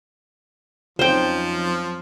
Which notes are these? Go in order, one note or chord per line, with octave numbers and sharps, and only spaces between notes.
F2 F3 F#3 C4 C#4 D#4 C5 G5